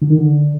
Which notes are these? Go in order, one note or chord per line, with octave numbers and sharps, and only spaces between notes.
D3
D#3
D3